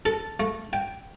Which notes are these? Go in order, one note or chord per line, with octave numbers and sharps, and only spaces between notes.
A4
A3
G5